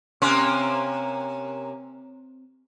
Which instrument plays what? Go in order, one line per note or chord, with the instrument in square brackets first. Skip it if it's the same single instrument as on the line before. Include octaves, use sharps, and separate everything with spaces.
[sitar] C3 A#3 C#4 [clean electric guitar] C4 C6